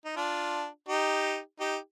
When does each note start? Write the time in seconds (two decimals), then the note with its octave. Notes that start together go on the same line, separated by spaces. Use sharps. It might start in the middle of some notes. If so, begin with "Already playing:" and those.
0.05 D#4
0.16 D4 F4
0.88 D#4 G4
1.60 D#4 G4